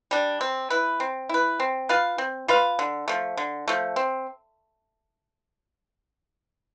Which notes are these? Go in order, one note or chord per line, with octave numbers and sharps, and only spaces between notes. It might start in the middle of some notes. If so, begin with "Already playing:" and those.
G3 D4
C4
E4 B4
C4
E4 B4
C4
F4 B4 F5
C4
F4 B4 F5
D3
F3 A3
D3
F3 A3
C4